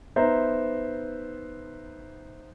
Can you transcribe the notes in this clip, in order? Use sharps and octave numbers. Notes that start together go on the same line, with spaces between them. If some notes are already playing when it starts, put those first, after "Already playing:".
B3 D#4 C5 E5 A#5